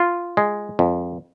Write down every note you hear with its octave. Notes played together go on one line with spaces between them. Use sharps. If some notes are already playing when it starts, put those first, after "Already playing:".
Already playing: F4
G#3
F2